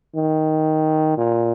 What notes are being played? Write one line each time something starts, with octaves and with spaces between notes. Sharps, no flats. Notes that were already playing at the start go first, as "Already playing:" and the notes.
D#3
A#2